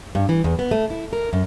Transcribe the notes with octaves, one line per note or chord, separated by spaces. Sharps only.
G2
E3
E2
B3
A3
E4
A#4
F#2